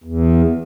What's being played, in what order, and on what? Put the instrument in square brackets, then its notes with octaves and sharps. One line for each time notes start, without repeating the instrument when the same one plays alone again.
[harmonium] E2